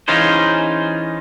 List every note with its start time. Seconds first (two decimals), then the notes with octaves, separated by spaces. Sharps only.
0.08 E3 C#4 D#4 F4 G#4 C5